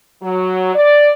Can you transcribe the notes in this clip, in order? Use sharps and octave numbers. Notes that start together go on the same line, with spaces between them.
F#3
D5